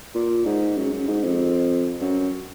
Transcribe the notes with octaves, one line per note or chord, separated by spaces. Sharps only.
A#2
G#2
F#2
F#2
G#2
F2
F#2